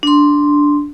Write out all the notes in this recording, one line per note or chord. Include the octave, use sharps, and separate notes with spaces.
D4 C6